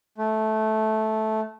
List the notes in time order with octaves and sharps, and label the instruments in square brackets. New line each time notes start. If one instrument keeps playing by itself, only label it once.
[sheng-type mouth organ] A3